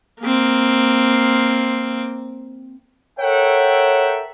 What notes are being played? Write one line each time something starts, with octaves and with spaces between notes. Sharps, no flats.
A#3 C4
A4 A#4 C#5 E5 F#5 G5